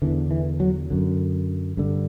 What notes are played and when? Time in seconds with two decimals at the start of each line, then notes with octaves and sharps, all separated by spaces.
0.02 E2 D3 E3
0.31 E3
0.60 F#3
0.90 F#2 D3
1.77 G2 D3